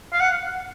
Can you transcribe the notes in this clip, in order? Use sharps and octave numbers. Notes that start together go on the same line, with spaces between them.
F5
F#5